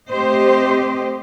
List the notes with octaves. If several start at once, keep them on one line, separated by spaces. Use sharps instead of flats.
A3 C4 G4 C5 D#5